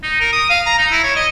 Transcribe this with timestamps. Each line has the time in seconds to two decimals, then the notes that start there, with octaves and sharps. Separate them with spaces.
0.03 D#4
0.20 A#4
0.32 D#6
0.50 F5
0.66 A#5
0.78 D#4
0.91 E4
1.03 C#5
1.16 D#5